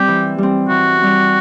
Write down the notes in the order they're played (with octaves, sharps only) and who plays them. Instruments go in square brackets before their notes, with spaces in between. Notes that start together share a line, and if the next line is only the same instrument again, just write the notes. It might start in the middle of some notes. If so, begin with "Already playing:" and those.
Already playing: [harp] G3 C4 [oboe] G4
[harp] E3
G3 C4
[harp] E3 [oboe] F#4
[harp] G3 C4